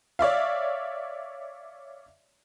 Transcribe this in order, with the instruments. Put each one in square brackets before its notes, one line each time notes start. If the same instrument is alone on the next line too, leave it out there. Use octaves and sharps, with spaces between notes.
[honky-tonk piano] C#5 D5 E5 F5